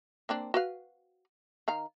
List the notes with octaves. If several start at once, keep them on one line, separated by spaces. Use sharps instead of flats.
A#3 C4 D4
F#4 B4 F5
D#3 F5 A#5